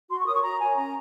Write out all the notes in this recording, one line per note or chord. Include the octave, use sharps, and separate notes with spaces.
F#4 C6
C#6
A#4 C#5 D#6
C#6
F#4 A#5
A#4 C#5 G#5
C#4 A#5